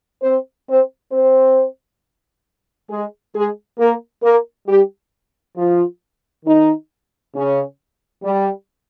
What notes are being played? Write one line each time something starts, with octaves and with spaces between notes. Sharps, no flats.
C4 C5
C4 C5
C4 C5
G#3 G#4
G#3 G#4
A#3 A#4
A#3 A#4
G3 G4
F3 F4
D#3 D#4
C#3 C#4
G3